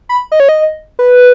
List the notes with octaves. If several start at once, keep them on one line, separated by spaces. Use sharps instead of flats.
B5
D#5
C#5
D#5
B4